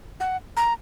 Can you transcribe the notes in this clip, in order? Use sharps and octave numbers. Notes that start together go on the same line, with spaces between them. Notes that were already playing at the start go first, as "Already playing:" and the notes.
F#5
A#5